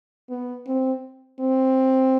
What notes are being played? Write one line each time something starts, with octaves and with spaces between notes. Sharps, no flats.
B3
C4
C4